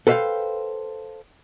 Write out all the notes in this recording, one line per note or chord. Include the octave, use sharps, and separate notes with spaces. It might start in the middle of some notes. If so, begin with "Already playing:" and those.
A4 B4 C5 E5 F5 G5